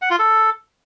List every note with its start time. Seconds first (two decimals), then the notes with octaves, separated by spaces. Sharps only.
0.02 F#5
0.10 F4
0.19 A4